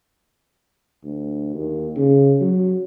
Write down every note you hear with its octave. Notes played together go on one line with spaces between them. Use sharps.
D2
D#2
C#3
F#3